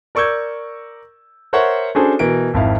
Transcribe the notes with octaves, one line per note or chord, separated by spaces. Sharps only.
A#4 D5 C#6 E6 G6 G#6
A#4 C5 C#5 E5 F#5 C#6
C#4 D4 F#4 G#4 A4 C5
B2 E3 A#4 D7
G#1 F2 E4 F5